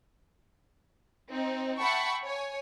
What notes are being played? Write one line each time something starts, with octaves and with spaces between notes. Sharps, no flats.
C4 D#4
E5 F#5 G5 A5 B5 C#6
C#5 G#5